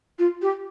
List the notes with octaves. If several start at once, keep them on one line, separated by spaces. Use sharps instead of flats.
F4
G4